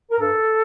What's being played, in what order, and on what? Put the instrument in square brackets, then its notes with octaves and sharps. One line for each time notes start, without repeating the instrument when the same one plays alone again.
[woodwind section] A#4
G2 A4